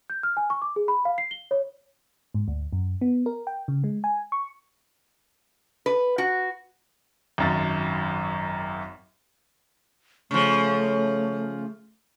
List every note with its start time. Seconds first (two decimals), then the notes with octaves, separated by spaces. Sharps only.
0.10 G6
0.23 F6
0.37 G#5
0.50 C#6
0.62 D6
0.76 G#4
0.88 B5
1.05 F5
1.18 C7
1.31 G7
1.51 C#5
2.34 G#2
2.48 D2
2.73 F#2
3.01 B3
3.26 A#4
3.47 G5
3.68 C#3
3.84 G#3
4.04 G#5
4.32 C#6
5.86 B4
6.18 F#4
7.38 G#1 F#2 A6
10.31 C#3 F3 A3